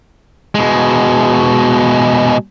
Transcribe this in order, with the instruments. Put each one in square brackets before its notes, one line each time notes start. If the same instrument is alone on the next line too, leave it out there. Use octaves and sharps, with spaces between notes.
[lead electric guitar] B2 G#3